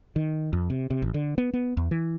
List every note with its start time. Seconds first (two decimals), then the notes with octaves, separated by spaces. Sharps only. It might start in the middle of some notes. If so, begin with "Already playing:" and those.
0.16 D#3
0.53 F2
0.70 C3
0.90 C3
1.02 A1
1.14 D3
1.38 B3
1.53 B3
1.77 E2
1.91 E3